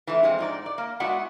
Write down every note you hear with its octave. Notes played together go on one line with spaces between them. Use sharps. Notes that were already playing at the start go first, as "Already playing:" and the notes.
E3 F3 A3 D4
F3 G#3 C4
G#2 D#4 D5
D5
A#3
G#3 B3 E4 F#4 D5 F#5